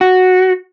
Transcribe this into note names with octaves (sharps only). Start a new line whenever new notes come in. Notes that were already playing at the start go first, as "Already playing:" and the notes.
F#4